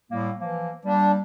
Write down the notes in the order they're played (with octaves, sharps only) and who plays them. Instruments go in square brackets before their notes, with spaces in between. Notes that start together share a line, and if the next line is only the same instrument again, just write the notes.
[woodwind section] A2 G3 A#3
E3 F3 A#3
[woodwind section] G3 A#3 [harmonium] D4